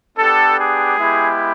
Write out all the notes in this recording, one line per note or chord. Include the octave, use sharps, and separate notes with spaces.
B3 D4 G4 A4
G#4
G#3 B3 E4 G4